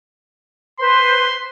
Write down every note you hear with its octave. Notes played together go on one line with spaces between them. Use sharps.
B4 C5 C6